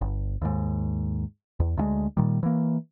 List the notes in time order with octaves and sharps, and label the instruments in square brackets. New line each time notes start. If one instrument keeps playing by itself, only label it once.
[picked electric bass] G1
D#2 G#2
E2
D2 D#3 G#3
A#2 D#3 G3
E3 A#3